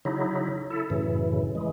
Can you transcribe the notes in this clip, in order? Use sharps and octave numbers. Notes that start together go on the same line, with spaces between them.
C#3 F#3 D#4 E4
E4 A4
F#2 A2 C#3 E3
E3 G#3